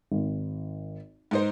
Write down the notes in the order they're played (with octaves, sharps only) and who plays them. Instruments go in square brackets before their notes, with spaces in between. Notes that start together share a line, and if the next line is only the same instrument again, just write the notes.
[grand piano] G#1
[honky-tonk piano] G#2 D#4 C5